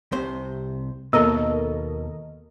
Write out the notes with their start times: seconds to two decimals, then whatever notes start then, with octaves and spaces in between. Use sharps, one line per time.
0.12 C2 C3 C5
1.13 D#2 B2 A#3 A4 A#4 D#5